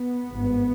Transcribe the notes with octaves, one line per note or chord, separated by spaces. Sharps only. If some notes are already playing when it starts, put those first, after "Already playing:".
Already playing: B3
G#1 G2